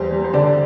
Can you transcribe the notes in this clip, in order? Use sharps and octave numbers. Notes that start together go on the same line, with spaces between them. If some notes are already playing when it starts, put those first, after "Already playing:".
Already playing: E2 G3 C5
G3
C5
D3 D5